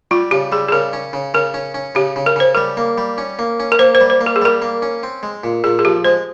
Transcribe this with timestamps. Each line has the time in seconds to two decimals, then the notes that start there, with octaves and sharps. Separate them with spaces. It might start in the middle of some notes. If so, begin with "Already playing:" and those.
0.11 G3 F4
0.31 C#3 G4
0.52 G3 G#4
0.68 G#4
0.72 C#3 A#4
0.93 C#4
1.13 C#3
1.34 C#3 A#4
1.54 C#4
1.74 C#4
1.95 C#3 G4
2.16 C#3
2.26 A#4
2.36 C#3 C5
2.55 G3 A#4
2.77 A#3
2.98 G3
3.18 C#4
3.39 A#3
3.60 C#4
3.72 A#4
3.79 A#3 C5
3.95 C5
4.01 G3
4.10 C5
4.21 A#3
4.26 A#4
4.36 G#4
4.42 G3 A#4
4.62 A#3
4.82 C#4
5.03 C4
5.23 G#3
5.44 A#2
5.64 A#2 G#4
5.79 G#4
5.85 F3 G4
6.04 G#3 C5